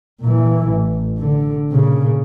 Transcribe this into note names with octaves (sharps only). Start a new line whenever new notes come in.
A#2 E3
A1
D3
A#2 C#3